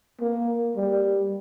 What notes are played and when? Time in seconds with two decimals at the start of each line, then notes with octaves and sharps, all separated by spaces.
0.20 A#3
0.76 G3